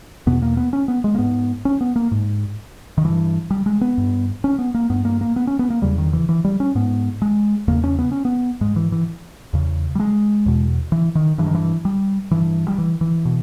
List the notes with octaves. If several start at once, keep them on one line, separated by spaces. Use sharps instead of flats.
E2 B2 B3
A#3
B3
C#4
B3
G#3
A#3
G#2 B3
C#4
B3
A#3
G#2
D#3
G2 E3
G3
G#3
B3
G2
C#4
B3
A#3
G2 B3
A#3
A#3
B3
C#4
B3
A#3
E2 C#3 G3
D#3
E3
E3
G3
C#4
G#2 B3
G#3
E2 C#3 A#3
C#4
B3
C#4
B3
G#2 G#3
E3
E3
E2 C#3
G3
G#3
E2 B2
E3
D#3
G2 E3
D#3
E3
G3
G2 E3
G3
E3
E3
B2